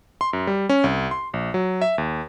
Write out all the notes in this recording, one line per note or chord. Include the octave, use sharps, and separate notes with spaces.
C6
F#2
G3
C#4
C2
C6
A#1
F#3
E5
D#2